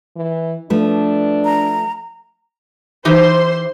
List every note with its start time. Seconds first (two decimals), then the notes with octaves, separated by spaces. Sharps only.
0.16 E3
0.70 F3 A3 D4 B4
1.45 A#5
3.05 E3 D#4 G4 C5 C6